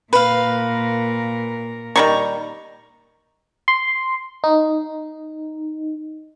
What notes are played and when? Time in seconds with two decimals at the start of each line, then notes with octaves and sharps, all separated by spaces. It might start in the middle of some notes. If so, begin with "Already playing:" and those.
0.13 A#2 A#4 B4 F5
1.96 D#3 G3 A#5 C#6
3.68 C6
4.44 D#4